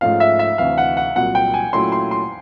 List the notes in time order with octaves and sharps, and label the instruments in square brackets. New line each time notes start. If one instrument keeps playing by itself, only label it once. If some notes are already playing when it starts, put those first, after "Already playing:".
[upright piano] G#2 F3 A3 C#4 F4 [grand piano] F5
[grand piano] E5
E5
[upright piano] D2 C3 E3 [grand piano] F5
[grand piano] F#5
F#5
[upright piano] C2 A#2 F#3 [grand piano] F#5
[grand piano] G5
G#5
[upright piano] A#2 F#3 A3 C#4 E4 [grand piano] C6
[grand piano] C6
C6